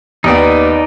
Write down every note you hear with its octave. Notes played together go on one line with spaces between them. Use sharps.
D#2 B3 D#4 D5